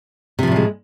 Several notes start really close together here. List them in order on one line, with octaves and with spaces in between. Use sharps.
C3 F3 A2 G3 G#3